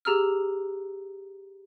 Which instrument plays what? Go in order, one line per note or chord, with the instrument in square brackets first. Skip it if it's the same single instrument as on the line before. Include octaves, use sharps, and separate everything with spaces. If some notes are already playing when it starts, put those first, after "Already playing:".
[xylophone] G4 G#4 A#5 E6 F6